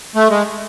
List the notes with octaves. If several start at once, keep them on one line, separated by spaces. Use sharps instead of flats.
A3
G#3